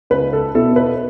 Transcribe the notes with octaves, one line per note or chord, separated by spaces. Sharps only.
C#2 B4
A4
B2 B3 E4 A4
B4